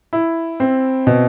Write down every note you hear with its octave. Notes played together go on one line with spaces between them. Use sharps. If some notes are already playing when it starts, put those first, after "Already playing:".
E4
C4
B2